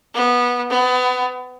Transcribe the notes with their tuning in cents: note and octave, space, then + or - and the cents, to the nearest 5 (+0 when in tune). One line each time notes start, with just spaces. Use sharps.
B3 -15
B3 +30